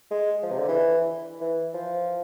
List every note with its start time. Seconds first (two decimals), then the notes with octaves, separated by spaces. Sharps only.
0.11 G#3
0.43 F3
0.52 C3
0.59 D3
0.68 E3
1.41 E3
1.74 F3